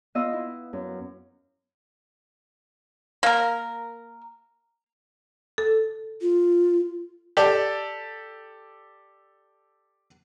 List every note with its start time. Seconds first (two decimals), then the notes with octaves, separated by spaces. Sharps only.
0.15 B3 F4 D#5 F5 E6
0.33 E4
0.73 F#2
3.23 A#3 A#4
5.58 A4
6.22 F4
7.37 G4 A4 D5